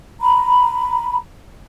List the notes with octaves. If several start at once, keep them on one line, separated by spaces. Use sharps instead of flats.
A#5 B5